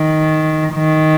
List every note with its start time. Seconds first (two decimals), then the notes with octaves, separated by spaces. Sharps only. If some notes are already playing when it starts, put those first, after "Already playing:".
Already playing: D#3
0.74 D#3